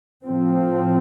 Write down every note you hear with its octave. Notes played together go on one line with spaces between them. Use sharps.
A2 F3 C4